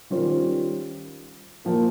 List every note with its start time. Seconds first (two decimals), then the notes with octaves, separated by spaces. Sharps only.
0.10 D#3 G3 C#4 F4 C5
1.65 A#2 F3 A#3